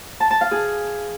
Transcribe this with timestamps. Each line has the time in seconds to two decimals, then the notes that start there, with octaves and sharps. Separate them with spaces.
0.20 A5
0.31 A5
0.41 F5
0.51 G#4